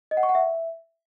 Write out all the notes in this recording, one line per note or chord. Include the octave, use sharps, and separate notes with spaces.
D#5
F#5
C#6
F#5
E5